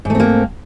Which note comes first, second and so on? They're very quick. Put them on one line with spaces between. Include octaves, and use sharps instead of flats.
G#2 A3 C4 A#3